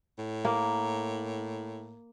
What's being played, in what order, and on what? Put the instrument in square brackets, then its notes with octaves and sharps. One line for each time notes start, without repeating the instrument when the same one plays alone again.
[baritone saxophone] A2
[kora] A#3